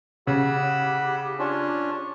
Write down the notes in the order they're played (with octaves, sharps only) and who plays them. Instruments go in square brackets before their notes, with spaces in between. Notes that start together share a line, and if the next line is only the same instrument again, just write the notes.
[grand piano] C#3 [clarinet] G4 [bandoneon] F#5 B5 E6
[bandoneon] C#4 D4 [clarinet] F4